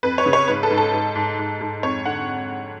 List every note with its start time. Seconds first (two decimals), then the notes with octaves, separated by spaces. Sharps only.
0.03 F2 B4
0.18 C#5
0.26 C#3
0.33 C#5
0.48 G#2 B4
0.63 A4
0.71 G#2
0.77 A4
0.93 G#2
1.15 G#2
1.39 G#2
1.61 G#2
1.83 F2 C#5
2.05 D3 F#5